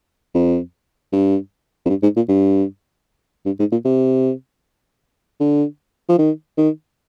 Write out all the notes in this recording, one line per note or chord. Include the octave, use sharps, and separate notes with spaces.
F2
G2
F2
G2
G#2
A#2
G2
G2
G#2
A#2
C3
D3
F3
D#3
D#3